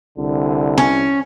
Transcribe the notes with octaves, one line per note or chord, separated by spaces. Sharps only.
C2 D3
C#4